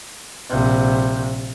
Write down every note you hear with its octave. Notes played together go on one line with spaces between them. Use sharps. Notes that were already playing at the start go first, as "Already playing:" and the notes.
A#1 C3